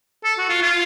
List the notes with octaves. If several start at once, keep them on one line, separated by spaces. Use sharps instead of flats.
A4
F#4
F4
F4